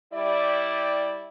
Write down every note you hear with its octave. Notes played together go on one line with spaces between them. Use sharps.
G3 E4 D5